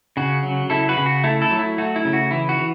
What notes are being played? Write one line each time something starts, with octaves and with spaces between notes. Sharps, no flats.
C#3 F#4
F#3
C#3 E4 A4
F#4 B4
C#3
F#4
A3 E4 A4
E4 A4
F#3
E4
A3 F#4
E4
C#3
F#4
E3 E4
F#4
E3